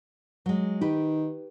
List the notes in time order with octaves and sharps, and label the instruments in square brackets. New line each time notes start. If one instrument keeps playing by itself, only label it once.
[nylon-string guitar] F#3 G#3
[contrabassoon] D#3 [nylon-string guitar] G4 B4